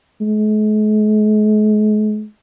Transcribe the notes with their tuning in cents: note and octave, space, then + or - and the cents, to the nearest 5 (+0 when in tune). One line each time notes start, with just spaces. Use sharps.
G#3 +45